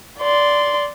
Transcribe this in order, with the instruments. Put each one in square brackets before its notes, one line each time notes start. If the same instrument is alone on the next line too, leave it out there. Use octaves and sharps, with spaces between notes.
[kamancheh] D5 C6